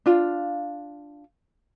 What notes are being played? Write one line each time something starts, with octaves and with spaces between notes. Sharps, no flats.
D4 F4 F5